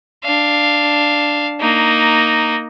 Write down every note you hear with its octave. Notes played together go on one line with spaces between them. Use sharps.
D4 F5
A#3 D#4